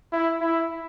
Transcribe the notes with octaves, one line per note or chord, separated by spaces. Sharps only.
E4
E4